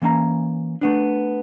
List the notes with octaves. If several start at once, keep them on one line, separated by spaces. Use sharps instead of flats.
E3 A#3 C#4 E5 A#5
A3 B3 D4